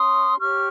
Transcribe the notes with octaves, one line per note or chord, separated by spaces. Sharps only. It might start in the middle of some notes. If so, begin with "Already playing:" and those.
Already playing: C#4 C6 D#6
G4 C#5 C#6 F6